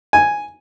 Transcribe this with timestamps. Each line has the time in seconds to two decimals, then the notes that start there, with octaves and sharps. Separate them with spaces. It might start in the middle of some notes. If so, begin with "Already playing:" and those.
0.13 G#5